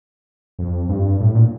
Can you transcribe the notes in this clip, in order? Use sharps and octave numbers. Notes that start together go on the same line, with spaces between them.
F2
G2
A2
A#2